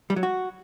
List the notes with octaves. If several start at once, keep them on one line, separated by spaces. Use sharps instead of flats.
G3
F#3
F#4